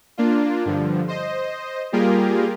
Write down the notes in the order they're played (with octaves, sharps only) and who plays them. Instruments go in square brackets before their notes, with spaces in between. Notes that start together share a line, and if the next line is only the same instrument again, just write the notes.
[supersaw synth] A#3 D4 F4
G2 D3 F3
C5 D#5
G3 A#3 F4 G4 G#4 A#4